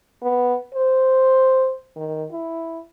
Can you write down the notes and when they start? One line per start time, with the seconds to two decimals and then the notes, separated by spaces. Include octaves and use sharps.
0.23 B3
0.75 C5
1.96 D#3
2.32 E4